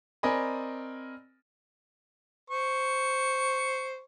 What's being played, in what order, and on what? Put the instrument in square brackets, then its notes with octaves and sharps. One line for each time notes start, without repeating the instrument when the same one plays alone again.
[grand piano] C4 A#4 D5 D#5 G#5 B5
[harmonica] C5 C#6